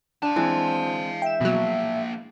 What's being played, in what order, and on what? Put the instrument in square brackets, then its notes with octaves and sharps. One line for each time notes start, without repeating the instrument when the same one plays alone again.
[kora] D4 [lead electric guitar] F5 A5
[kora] E3 G#3 [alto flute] C4
[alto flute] E5 [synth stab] G5 E7
[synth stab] B2 F#3 [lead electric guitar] F3 A#3